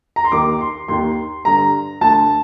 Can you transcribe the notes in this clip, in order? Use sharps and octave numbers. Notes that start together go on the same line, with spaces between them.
A#5
C6
D#2 D#3 D6
C6
D#2 D#3 C6
G2 D3 A#5
D2 D3 A5